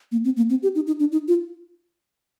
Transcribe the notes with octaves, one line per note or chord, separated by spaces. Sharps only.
A#3
C4
A#3
C4
G4
D#4
D#4
D4
D#4
F4